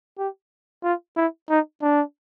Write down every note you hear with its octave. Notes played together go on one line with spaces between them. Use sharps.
G4
F4
E4
D#4
D4